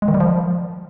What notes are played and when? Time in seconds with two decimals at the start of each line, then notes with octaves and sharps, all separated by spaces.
0.02 G#3
0.08 D#3
0.14 G3
0.20 F3